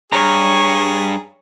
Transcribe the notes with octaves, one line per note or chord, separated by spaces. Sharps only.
G2 G#4 C#5 A#5